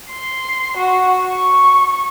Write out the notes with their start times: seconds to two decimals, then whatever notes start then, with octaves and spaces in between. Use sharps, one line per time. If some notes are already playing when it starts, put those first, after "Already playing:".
0.11 C6
0.77 F#4
1.28 C#6